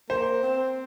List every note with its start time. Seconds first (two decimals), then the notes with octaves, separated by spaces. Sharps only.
0.10 A#3 C5
0.43 C4